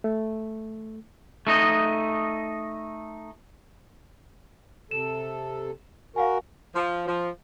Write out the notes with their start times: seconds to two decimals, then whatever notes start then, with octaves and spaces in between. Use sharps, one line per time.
0.04 A3
1.47 A3 D#4 D#5
4.91 C3 A4 E7
6.16 F#4 A#4 F5 F#5 G#5
6.74 F3
7.07 F3